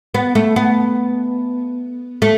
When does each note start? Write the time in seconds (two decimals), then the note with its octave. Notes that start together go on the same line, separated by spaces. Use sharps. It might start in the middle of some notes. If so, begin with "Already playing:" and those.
0.14 B3
0.35 A3
0.56 B3
2.22 A3